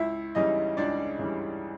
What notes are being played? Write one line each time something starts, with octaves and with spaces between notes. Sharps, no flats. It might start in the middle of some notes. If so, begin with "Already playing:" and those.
Already playing: C#2 E4 E5
C#3 E3 G3 D#4 D#5
C#2 D4 D5
C#3 E3 G3